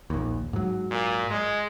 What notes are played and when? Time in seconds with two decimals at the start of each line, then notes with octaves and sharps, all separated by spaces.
0.10 A#1 D#2
0.53 G#2 F#3
0.91 A#2
1.30 G#3